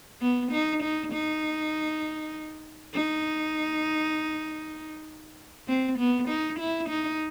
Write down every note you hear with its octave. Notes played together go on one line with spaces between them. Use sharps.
B3
D#4
D#4
D#4
D#4
C4
B3
D#4
E4
D#4